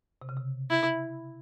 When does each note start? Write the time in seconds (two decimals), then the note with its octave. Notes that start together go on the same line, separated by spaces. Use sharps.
0.22 C3
0.29 C#3
0.37 C3
0.70 E4